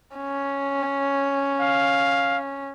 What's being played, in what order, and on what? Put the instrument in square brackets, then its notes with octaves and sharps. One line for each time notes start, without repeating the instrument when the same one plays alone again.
[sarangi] C#4
[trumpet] F5